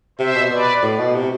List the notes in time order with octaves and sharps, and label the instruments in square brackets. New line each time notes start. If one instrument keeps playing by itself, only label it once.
[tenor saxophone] C3 [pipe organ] C5 E5
[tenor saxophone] B2
[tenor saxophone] B2 [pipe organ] B4 D5
[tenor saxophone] A2
B2
C3